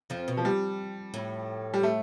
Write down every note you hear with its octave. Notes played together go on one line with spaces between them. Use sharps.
F2 F3
B2
F3
G3
A2
G3
A3